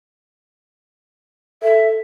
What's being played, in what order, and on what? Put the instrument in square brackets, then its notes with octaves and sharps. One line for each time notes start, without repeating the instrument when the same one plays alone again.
[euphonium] A4 [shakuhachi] E5